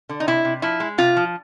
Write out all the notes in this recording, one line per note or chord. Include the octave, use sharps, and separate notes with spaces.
D3
D#4
C3 E4
C3
F3 E4
G#3
C3 F4
F3